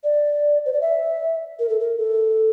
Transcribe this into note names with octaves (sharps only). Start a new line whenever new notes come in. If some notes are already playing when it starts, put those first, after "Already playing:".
D5
C5
D5
E5
A#4
A4
A#4
A4